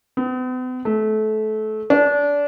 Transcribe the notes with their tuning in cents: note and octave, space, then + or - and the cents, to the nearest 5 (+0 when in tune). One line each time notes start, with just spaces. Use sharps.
B3 +45
A3 -25
D4 -25